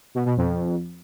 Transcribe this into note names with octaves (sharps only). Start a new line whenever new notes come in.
B2
B2
F2